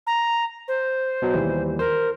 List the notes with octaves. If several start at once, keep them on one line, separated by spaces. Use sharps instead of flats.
A#5
C5
B2 F#3
D#2 E3 G3
A#4 C5